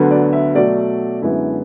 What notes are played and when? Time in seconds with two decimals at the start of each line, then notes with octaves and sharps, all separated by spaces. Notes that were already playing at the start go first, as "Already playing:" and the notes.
Already playing: D2 D3 F#3 B3
0.11 D5
0.33 E5
0.55 B2 F#3 A3 D5
1.22 F#2 D3 G#3 B3 E4